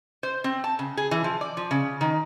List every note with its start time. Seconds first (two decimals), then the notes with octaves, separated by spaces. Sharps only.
0.23 C5
0.44 C4
0.64 A5
0.79 C#3
0.97 G#4
1.11 E3
1.24 F3
1.41 D5
1.57 F3
1.71 C#3
2.01 D#3